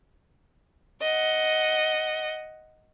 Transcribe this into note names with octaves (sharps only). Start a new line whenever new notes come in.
D#5 F#5